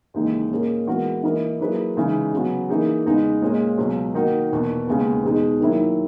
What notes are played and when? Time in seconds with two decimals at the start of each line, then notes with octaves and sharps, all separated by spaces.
0.14 D#2 C#3 E3 G#3 D#4
0.51 A#2 A#3 C#4 G#4 D#5
0.87 E3 G#3 B3 F#4 A#4
1.23 E3 A#3 E4 A#4 D#5
1.59 F#3 A#3 E4 G#4 B4
1.97 C#3 E3 G#3 D#4
2.33 C#3 F#3 B3 F#4
2.69 E3 A#3 D#4 G#4
3.06 E2 C#3 G#3 B3 D#4
3.42 A#2 G#3 C#4 G#4 D#5
3.78 C#2 B2 F#3
4.14 D#3 A#3 D#4 F#4
4.50 E2 B2 A#3
4.87 D#2 C#3 G#3 B3
5.23 E2 B2 G#3 D#4 G#4
5.60 D#3 F#3 A#3 E4